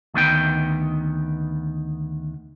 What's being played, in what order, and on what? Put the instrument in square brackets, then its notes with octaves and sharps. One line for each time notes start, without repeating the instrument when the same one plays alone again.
[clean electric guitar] D2 D#3 B3 G5